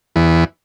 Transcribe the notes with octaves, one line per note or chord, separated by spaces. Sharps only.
E2